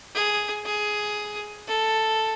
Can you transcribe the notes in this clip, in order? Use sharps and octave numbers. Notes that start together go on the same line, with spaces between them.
G#4
G#4
A4